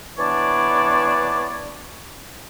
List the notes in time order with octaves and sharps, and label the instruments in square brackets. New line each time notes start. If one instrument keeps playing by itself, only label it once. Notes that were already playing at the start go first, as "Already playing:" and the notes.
[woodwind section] E3 B3 D4 C#5 D5